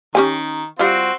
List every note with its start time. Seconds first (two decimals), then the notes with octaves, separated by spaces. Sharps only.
0.15 D#3 C#4 G4 G#5
0.79 G3 C4 F4 F#4 C6